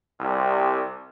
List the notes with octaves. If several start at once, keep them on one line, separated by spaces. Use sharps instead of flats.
C2